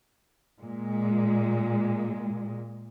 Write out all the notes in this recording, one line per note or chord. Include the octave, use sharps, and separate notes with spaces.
A#2 G#3